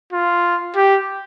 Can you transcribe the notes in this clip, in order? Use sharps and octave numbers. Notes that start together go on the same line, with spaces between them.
F4
G4